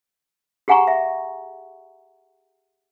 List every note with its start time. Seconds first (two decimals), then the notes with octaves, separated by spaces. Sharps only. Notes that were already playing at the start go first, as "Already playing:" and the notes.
0.68 G4 G#4 F#5 G#5 A#5 C#6
0.87 E5